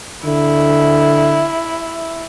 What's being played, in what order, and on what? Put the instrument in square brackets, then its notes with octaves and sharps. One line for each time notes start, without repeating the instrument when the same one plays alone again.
[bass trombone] D3 [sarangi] E4